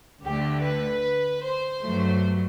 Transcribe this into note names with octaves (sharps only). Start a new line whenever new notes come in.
D2 D3 A3 G4
B4
C5
G2 F#3 A3